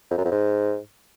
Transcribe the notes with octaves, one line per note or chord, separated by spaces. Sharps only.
F2
F#2
F2
G#2